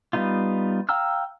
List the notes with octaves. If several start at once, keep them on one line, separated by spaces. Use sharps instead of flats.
G3 B3 D#4 F4
F5 G5 A#5 E6 F6